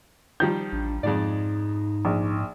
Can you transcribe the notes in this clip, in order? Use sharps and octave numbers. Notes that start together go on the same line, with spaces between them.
D#3 F3 G3 G6
A1 D4
F2 G#2 G#3 D#4 D5
A#1